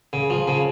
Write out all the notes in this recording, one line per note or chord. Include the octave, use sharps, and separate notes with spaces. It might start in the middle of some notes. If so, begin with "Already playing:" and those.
C#3
F3
C#3